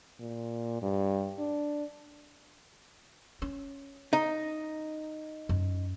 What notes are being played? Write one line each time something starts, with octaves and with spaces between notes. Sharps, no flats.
A#2
G2
D4
C#4
D#4
F#2